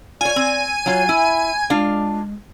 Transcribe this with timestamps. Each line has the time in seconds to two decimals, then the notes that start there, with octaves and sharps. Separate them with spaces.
0.21 F4 C#5 D5 G#5
0.36 C4
0.86 F#3 F4 C#5
1.09 E4 E5
1.70 G#3 D4 F4 F5